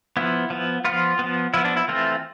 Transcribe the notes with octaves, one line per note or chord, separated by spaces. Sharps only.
F3 B3 E4
F3 B3
F3 B3 F4
F3 B3
F3 B3 E4
D4
E4
E3 A3 C4 F4